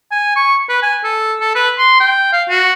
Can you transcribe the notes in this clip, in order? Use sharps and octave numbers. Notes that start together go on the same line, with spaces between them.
G#5
C#6
B4
G#5
A4
A4
B4
C6
G5
F5
F#4